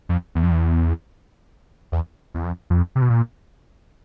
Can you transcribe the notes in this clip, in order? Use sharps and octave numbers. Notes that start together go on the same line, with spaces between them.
F2
E2
F2
E2
E2
E2
F2
F2
C3
B2
A#2